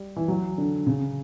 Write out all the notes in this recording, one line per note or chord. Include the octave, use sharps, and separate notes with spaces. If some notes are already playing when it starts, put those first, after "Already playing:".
Already playing: G3
E3
F#3
D3
C#3